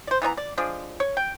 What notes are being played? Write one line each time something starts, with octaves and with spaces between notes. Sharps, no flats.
C5 D5
E3 B3 C#5 A#5
D5
F3 G#3 D4
C#5
G5